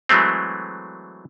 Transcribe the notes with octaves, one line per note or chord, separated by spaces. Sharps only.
E3 F#3 G#3 A3 C4